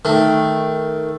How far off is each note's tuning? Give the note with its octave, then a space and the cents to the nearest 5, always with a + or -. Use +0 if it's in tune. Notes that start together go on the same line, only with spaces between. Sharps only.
D#3 +10 A3 +0